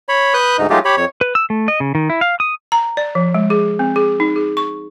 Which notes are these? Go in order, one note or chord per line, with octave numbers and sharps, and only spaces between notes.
C#5 B5
B4 D#6 F#6 G6
D2 G#2 D#4
F#3 G#3 A3 D#4 F4 G4
G4 C#5 B5
F2 C#5
B4
E6
A3
D#5
C#3
D#3
E4
F5
D#6
A#5
D5
F3
G#3
G#4
C4
G#4
D#4
G#4
C#6